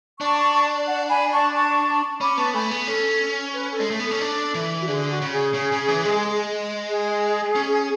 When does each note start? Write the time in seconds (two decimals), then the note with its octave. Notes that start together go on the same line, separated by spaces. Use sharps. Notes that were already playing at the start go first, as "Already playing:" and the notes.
0.20 D4 A5 C#6
0.87 F#5 A5
1.09 G#5 B5
1.31 A5 C#6
1.54 A5 C#6
2.20 C#4 B5 D6
2.37 B3 A5 C#6
2.54 A3 G#5 B5
2.71 B3
2.88 C#4 A4
3.54 B4
3.71 A4
3.80 G#3
3.90 A3
4.00 B3
4.05 A4
4.11 C#4
4.21 D4
4.55 E3
4.81 F#4
4.88 D3 G#4
5.10 F#4
5.21 C#3
5.32 G#4
5.54 C#3
5.72 C#3
5.88 E3
6.05 G#3
6.88 G#4
7.56 C#4